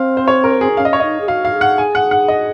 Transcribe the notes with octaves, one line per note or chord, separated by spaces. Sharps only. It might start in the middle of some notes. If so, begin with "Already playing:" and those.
Already playing: C4 F5
C5
C#5
A#4
G#4
C#4 F5
D#5
C#5
D#4 D#5
G#4
F#4 F5
F5
G#4
F#5
G#5
F#5
F#5
D#5